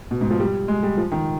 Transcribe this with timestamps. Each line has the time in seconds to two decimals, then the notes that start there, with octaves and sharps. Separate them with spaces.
0.11 B2
0.21 G#2
0.30 F3
0.40 G3
0.68 G#3
0.83 G3
0.97 F3
1.12 D#3